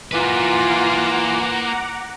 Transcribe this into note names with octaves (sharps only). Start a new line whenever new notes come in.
E3 A#3 F4 B4 F#5 A#5 D6